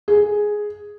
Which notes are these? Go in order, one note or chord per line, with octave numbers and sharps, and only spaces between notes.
G#4